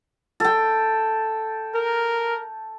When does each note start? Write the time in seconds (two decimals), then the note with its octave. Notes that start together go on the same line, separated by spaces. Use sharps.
0.40 A4 G5
1.75 A#4